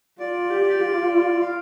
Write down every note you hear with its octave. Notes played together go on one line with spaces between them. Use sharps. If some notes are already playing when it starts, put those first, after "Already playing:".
F4 D5
G4
F4
F5